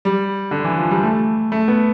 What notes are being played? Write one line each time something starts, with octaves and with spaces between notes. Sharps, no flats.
G3
D3
E3
F3
G3
A3
A3
B3